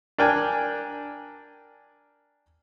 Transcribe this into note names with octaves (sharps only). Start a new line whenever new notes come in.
D4 A#4 G5 G#5